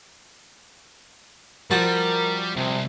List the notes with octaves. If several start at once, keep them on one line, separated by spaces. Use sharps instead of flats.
F3 G3 F#4 A#4 A5
C2 C3